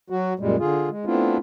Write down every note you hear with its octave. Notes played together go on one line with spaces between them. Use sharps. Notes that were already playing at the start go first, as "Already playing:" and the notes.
F#3 F#4
F#2 A#2 G3 G#3
D3 F4 G#4
G#3
A3 B3 C4 D4 E4 F4